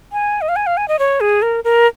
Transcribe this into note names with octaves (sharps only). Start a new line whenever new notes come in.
G#5
D#5
F5
G#5
F5
G#5
D#5
C#5
G#4
A#4
A#4